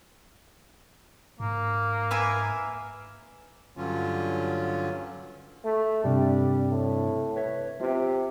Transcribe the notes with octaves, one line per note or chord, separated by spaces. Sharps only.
G#2 A#3
B4 E5 G#5
G2 D3 F#3 C#4 F4
A3
G2 C3 G3 D4
A2
B4 C#5 E5
C3 F4